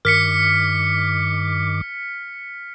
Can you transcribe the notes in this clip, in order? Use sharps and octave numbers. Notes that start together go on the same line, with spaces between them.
G2 D#3 D6 F6 B6 C#7